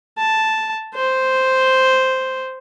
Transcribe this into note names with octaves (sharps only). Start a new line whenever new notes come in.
A5
C5